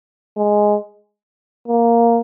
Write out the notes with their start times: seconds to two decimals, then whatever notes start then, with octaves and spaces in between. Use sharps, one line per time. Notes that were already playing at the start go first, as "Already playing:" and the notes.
0.37 G#3
1.68 A#3